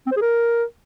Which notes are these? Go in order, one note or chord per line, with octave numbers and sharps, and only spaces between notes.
C4
C5
G#4
A#4